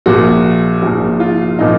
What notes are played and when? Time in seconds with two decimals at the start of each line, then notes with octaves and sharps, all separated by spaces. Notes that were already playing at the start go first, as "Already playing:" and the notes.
0.06 A#1 A#2 F3 F#4
0.82 A#1 A#2 F3 F#4
1.20 F4
1.59 A#2 F3 D#4